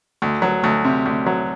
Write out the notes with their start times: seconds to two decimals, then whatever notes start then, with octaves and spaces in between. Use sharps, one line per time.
0.22 D2
0.42 F#3
0.64 D2
0.84 C3
1.05 D2
1.26 F#3